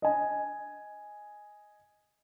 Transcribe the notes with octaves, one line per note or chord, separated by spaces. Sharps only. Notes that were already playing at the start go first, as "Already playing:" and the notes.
D#5 G#5